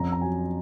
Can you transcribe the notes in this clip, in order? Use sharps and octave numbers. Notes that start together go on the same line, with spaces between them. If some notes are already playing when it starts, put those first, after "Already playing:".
Already playing: F2 C#4 A#5
A#5
F#3 G#5